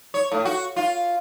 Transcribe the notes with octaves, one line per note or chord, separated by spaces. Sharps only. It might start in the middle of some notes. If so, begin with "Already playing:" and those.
C#5
A2
F#4
F4